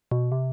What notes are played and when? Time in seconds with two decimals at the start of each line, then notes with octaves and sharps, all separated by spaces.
0.11 B2
0.32 C3